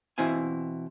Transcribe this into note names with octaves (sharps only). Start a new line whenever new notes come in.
B2 E3 C4 E4 F5 G#5